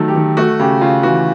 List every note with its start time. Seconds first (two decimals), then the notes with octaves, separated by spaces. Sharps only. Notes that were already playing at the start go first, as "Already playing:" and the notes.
Already playing: D#3 F#3 A3 A4
0.08 G4
0.15 D#3
0.37 A3 F#4
0.59 C#3 G4
0.81 C#3 F4
1.03 E3 F#4